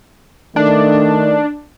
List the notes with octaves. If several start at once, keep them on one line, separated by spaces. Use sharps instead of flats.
D#3 A3 D4